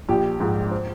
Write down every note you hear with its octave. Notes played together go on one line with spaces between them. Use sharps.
A#1 G4
G#2 F3 G#3
C5